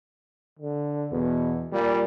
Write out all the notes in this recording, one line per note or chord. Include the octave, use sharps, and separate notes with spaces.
D3
E2 B2
A#2 G3